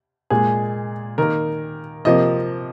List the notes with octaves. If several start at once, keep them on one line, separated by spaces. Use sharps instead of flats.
A#2 G#3 G#4
D#3 A#3 A#4
C3 F3 A#3 D#5